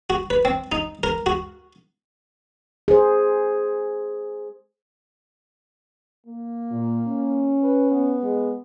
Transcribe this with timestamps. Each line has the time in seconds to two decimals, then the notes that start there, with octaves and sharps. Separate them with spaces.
0.10 F#4
0.30 B4
0.45 C4
0.72 D#4
1.03 A#4
1.26 F#4
2.88 G#4 C5
6.26 A#3
6.71 A#2
7.07 C#4
7.62 B4
7.91 B3
8.23 G#3